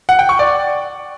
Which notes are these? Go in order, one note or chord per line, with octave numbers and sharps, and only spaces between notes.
F#5
G5
C#6
D5